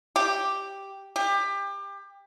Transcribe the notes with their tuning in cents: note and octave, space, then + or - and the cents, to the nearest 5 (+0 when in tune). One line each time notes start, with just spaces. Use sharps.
G4 +0
G4 +25